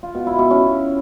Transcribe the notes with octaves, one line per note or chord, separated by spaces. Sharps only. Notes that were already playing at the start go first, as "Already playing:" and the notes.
F4
B2
E4
B2
C#4